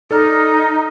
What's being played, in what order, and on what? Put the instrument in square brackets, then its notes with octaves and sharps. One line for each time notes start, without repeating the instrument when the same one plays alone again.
[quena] D#4 [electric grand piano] A4 D5 F6